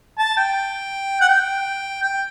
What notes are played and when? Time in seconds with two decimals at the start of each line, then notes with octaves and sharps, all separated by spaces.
0.19 A5
0.37 G5
1.21 F#5
1.29 G5
2.03 G5